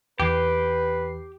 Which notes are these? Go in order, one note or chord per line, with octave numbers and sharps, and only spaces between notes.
E2 E3 G4 B4 C7